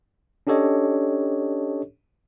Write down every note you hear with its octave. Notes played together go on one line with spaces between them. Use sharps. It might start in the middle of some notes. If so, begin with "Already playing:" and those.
C#4 D4 G4 A4 C#5 D#5